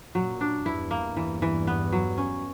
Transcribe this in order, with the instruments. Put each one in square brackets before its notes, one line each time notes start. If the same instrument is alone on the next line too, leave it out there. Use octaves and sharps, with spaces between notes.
[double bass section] F#2 A#2 [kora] F#3
[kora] D4
[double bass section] E2 G2 [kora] E4
[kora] A#3
[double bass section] E2 G2 [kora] E3
[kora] E3
B3
F#3
C#4